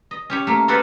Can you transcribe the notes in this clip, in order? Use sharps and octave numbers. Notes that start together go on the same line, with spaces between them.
D#5
C#4 G4 C#5
A3 A#3
F4 F#4 A4 B4 C5 D5